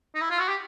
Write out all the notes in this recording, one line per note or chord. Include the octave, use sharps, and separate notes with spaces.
D#4
E4
F4
F#4
G4